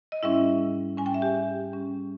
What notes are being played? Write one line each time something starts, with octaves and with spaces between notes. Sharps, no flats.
D#5
G#2 G3 C#4 E4 E5
G#2 G3 C#4 G#5
G5
E5
G4 G5
G#2 G3 C#4